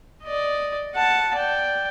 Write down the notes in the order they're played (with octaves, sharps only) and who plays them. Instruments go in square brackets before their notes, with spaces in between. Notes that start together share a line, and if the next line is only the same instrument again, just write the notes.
[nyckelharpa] D5 D#5
F#5 A5
D5 G5